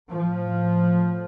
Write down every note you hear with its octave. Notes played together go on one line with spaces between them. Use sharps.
A2 F3